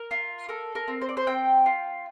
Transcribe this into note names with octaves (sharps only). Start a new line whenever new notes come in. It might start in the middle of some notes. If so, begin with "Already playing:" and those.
Already playing: A#4
F4
A4 A#4
A#4
C4
C5
D5
C5
C4 G5
F4